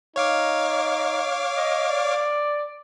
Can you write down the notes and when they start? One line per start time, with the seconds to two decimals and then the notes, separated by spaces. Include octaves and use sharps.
0.16 D#4 C#5 F5 D6
1.57 D#5
1.89 D5